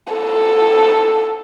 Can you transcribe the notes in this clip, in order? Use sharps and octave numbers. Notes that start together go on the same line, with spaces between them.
A4